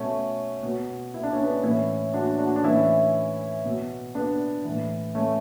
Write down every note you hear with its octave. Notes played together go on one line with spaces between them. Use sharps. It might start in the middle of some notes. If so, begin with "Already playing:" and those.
Already playing: B2 A3 C#4
B2
E4
D4
C#4
B3 D4
A2 E3 C#4 E4
D4 F#4
D4 F#4
D4
A2 E3 C#4 E4
B2
B3 D4
A2 E3
A3 C#4